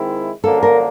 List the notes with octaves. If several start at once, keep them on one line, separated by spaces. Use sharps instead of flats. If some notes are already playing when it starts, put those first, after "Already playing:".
Already playing: D#3 G#3 C4 E4
F#2 D3 F3 A#3 D4 A4
A#4